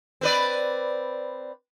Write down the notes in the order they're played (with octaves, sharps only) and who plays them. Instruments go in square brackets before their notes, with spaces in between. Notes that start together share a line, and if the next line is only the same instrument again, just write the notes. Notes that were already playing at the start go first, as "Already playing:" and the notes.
[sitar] C4 B4 D5